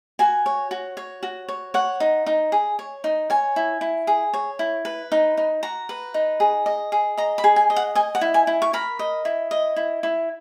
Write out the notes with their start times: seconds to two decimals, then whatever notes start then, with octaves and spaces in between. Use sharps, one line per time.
0.19 F#4 G#5
0.46 C#5
0.71 F#4
0.97 C#5
1.23 F#4
1.48 C#5
1.74 C#5 F#5
2.00 D#4
2.26 D#4
2.52 G#4
2.79 C#5
3.04 D#4
3.30 C#5 G#5
3.56 E4
3.81 E4
4.07 G#4
4.34 C#5
4.59 E4
4.85 B4
5.12 D#4
5.37 D#4
5.63 F#4 A#5
5.89 B4
6.14 D#4
6.40 G#4
6.66 D#5
6.92 G#4
7.17 D#5 A#5
7.38 B5
7.44 G#4
7.56 G#5
7.70 D#5
7.76 F#5
7.95 D#5 G#5
8.15 F#5
8.21 E4
8.34 G#5
8.47 E4
8.62 C#6
8.73 A#4 B5
8.99 D#5
9.25 E4
9.51 D#5
9.76 E4
10.03 E4